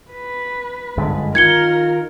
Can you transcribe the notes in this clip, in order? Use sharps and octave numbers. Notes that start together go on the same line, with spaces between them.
B4
G1 F#2 D3 G#3
D#3 D#4 F4 A#4 G#6 C#7 G7